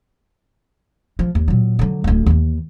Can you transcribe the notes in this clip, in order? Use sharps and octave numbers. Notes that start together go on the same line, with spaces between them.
F3
D#2
A#2 F#3
D3 F#3
D1 D2
D#2 E3